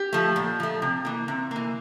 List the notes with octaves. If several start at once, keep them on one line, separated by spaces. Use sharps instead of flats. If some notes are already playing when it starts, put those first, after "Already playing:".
Already playing: G4
F3 A3
A#2
F3 A3
C3
E3 A#3
C3
E3 A#3